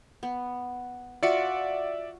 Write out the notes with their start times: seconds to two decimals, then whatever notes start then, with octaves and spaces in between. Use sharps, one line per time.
0.23 B3
1.23 F4 F#4 D5 E5 C#7